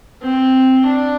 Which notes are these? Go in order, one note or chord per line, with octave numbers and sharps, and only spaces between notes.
C4
D4